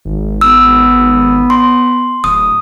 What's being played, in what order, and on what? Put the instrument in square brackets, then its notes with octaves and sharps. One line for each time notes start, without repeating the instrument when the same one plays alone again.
[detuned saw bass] G#1
[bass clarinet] B3 [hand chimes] E6
[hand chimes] C6
[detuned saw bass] D1 [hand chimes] D#6